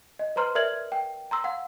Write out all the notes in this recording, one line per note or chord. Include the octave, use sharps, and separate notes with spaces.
D#5
B4 C5 A#5 C6 F6
A#4 D5 E5 F6 G#6 F#7
G5
A#5 C6 E6
F5 F#5